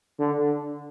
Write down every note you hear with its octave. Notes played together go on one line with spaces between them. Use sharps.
D3